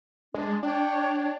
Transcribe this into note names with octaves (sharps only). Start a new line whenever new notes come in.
G#3 D4
D4 C#5 G5